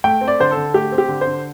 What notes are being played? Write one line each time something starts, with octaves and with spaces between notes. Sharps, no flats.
A3 G5
C4
D5
D3 C5
A4
D3
A3 G4
C4
G4
D3
C5
D3